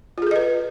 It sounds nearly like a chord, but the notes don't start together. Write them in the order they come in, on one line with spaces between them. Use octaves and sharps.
F4 G#4 A4 D#5 B4